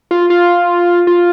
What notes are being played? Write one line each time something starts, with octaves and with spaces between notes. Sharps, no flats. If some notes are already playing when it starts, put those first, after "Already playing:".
F4
F4
F4